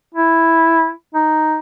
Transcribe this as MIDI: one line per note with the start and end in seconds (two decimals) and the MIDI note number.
0.15 0.91 64
1.14 1.59 63